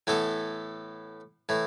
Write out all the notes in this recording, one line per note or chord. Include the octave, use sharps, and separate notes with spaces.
A2 E3 B3 A4
A2 E3